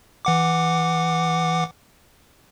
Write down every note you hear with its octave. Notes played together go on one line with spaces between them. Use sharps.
E3 F#5 D6